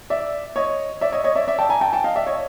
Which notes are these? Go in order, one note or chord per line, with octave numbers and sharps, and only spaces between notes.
D5 E5
C#5 D#5
D5 E5
C#5 D#5
C#5 D#5
D5 E5
D5 E5
G5 A5
G#5 A#5
G5 A5
G5 A5
D#5 F5
D5 E5
C#5 D#5